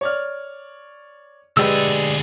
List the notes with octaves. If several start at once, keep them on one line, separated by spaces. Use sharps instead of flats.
C#5 D5 F6
D2 G#3 G4 G#4 B4 D5 E6